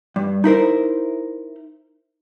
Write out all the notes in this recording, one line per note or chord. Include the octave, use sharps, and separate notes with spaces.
G2
D#4 E4 A#4 C5